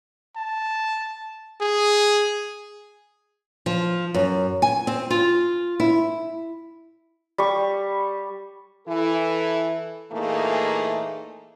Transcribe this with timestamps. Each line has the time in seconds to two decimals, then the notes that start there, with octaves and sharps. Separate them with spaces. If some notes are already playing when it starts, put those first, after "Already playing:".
0.36 A5
1.61 G#4
3.66 F3
4.14 F#2
4.62 G#5
4.87 C4
5.10 F4
5.80 E4
7.38 G3 C#6
8.87 E3 E4 A4
10.12 A#2 E3 A3 A#3 D#4 G#4